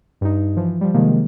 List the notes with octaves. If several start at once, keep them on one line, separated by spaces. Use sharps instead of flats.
G2 D#4
E3 F3
F3 G3
C3 D#3 F3 G#3 A#3